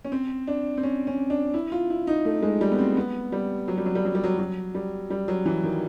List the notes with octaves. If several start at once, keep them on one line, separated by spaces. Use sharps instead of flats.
C#4
C4
D4
C4
C#4
C#4
D4
E4
F4
E4
D#4
A3
G#3
G3
B3
C4
B3
G3
F#3
G3
F#3
G3
F#3
G3
F#3
F#3
G3
G3
F#3
E3
D#3